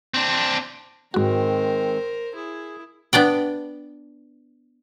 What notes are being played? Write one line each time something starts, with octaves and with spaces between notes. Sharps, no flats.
C4 D4
G#2 D#3 G#3 C4 F#4 A#4 C5
E4 G#4
B3 D4 D5 G5